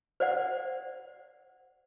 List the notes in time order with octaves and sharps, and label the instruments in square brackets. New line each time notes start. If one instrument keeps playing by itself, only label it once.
[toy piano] C5 D5 F#5